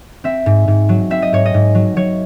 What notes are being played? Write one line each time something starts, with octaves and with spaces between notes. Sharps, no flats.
C4 E5
G#2
G#2
F#3
C4 E5
D#5
G#2 C#5
D#5
G#2
F#3
F#3 C#5